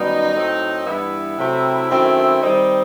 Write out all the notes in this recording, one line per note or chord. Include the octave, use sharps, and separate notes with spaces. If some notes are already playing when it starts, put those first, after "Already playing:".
Already playing: F#2 D#3 G3 B3 D#4
A2 F#3 C4
G2 E3 B3 E4
C3 F#3 A3 C4
F#2 D#3 A3 C4
D#3 G3 C4 D#4